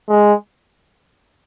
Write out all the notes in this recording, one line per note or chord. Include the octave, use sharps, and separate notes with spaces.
G#3